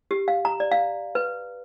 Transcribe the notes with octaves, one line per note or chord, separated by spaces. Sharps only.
G4
F5
A#5
D5
F5
B4